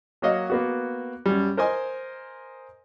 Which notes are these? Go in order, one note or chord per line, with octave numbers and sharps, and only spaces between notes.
F#3 A#3 F#4 C#5 D#5 F5
A#3 B3 F#4
F#2 G3
A#4 C5 D#5 G#5 C6